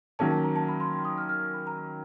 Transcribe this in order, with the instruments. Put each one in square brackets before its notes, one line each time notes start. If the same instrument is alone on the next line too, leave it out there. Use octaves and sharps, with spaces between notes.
[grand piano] D#3 F#3 A#3 C#4 [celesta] A5
[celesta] A5
A#5
A5
B5
C6
C6
D#6
F6
F6
B5
A#5